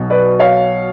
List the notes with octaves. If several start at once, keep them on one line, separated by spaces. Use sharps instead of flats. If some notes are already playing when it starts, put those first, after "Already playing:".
Already playing: B1 B2 F#3
B4 D5
C#5 F5